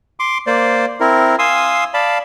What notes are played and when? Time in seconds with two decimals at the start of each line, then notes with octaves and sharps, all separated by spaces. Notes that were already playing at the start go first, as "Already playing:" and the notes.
0.20 C6 D6
0.47 A#3 C5 D5
1.00 C4 E4 A#4
1.39 F5 G#5 C6 D#6 E6
1.94 D5 F5 A5 B5